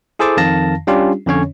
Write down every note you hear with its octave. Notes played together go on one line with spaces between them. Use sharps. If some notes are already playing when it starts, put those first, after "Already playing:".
E4 G#4 A4 C5 A5 D6
F2 D#3 F5 A5 A#6
G3 C#4 D4 F4 G4
F2 D3 C#4 C#5